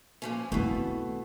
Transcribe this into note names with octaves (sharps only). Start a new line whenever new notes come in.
A#2 F3 C#4
B2 A3 C4 E4